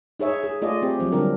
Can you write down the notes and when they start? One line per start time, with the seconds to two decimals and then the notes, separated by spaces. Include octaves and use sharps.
0.19 D#4 G#4 C#5 E5
0.44 G#4
0.62 A3 F4 G#4 D5 D#5
0.82 C4 G4
1.00 F3 F#3 C4
1.12 D3 G3 D4 A#4